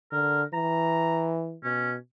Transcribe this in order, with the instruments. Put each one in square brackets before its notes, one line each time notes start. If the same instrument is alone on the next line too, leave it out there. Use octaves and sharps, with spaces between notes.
[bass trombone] D3 [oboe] A#4
[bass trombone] E3 [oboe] A#5
[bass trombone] B2 [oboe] C#4